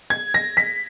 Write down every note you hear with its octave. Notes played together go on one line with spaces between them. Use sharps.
G#6
A#6
B6